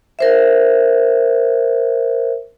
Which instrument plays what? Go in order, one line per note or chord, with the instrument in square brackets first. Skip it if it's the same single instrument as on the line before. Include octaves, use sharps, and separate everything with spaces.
[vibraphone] A#4 C5 E5